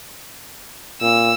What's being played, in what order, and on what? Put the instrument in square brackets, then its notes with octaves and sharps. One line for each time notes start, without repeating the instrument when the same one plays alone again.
[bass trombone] A#2 [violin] E6